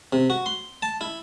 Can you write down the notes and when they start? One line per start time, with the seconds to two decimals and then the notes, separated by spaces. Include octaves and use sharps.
0.13 C3
0.30 F#4
0.46 C6
0.82 A5
1.01 E4